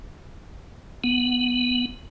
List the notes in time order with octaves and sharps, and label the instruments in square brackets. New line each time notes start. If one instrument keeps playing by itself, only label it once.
[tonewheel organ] B3